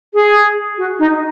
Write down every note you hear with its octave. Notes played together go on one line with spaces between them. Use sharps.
G#4
F#4
D#4